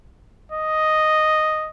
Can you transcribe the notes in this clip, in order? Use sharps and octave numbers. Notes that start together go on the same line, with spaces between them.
D#5